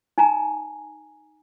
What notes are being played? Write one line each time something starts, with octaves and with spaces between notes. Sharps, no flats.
D#4 G#5 A#5